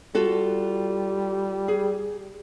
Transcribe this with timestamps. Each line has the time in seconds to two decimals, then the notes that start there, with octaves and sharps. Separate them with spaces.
0.15 G3 F4 F#4 A4
1.68 G#4